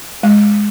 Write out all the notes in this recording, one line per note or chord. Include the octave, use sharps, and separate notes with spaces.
G#3